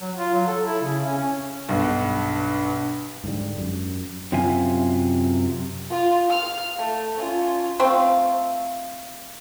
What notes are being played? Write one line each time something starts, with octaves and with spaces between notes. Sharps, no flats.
F#3
F4
F#3
A4
E4
C#3
C#4
C#4
B1 G2
G#2 D3 E3 G3
F#2
F#2 C3 F4 E5 F5 G#5
F4 F5
F5 F6
A3
C#4 F4
A3 C4 F4